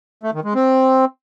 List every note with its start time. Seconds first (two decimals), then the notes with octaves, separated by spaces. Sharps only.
0.23 A3
0.34 D#3
0.44 G#3
0.55 C4